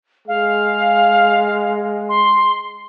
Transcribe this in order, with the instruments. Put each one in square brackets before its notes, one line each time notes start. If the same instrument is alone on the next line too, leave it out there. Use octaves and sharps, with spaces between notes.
[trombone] G#3 [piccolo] F5
[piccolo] C6